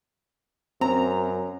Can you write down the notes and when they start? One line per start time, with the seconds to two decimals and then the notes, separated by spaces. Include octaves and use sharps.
0.81 F#2 C4 A#5